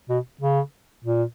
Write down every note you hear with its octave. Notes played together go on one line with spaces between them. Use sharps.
B2
C#3
A#2